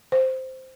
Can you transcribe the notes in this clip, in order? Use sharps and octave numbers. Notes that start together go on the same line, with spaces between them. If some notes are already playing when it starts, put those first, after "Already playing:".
C5